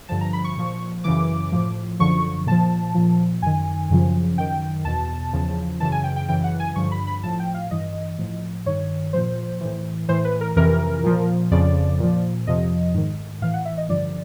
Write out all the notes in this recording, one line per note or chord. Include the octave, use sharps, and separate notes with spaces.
G2 D3 F3 A5
A#5
B5
C#6
A#2 F3
F#2 C#3 E3 D6
A2 F3
F#2 D3 F3 C#6
A#2 F3 A5
A#2 F3
F#2 D#3 G#5
F#2 C#3 F3
F#2 D#3 G5
E2 B2 A5
E2 C#3 F3
F#2 C#3 E3 A5
G#5
G5
G5
F#2 C#3 E3 G5
F#5
G#5
G2 D3 F3 C#6
B5
B5
A2 F3 A5
G5
F5
G2 E3 D#5
A2 F3
G2 D#3 C#5
A#2 F3 C5
A2 E3
A2 E3 C5
B4
A#4
F2 C3 E3 A#4
A#2 F3
F2 C#3 F3 D5
A#2 F3
F2 C3 F3 D#5
G#2 D#3
A2 E3 F5
F#5
E5
D#5
G2 D3 F3 D5